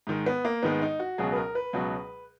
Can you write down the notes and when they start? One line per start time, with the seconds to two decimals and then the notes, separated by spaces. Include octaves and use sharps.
0.07 G#2 D#3 G#3
0.26 B3
0.45 A#3
0.63 G#2 D#3 G#3 B3
0.82 D#4
0.99 F#4
1.18 C#2 B2 F#3 G#4
1.32 B4
1.36 A#4
1.55 B4
1.73 C#2 B2 F#3